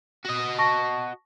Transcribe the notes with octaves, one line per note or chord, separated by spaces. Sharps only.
F#4 D#5
A5 C#6 A#6